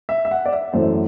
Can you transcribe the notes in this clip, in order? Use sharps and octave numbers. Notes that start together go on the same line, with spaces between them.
E5
E5
F#5
D5
E5
F#2 E3 A3 C5